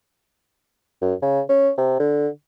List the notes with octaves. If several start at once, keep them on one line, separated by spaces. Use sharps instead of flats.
F#2
C#3
C#4
C3
D3